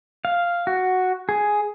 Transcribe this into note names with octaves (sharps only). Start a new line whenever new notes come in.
F5
F#4
G#4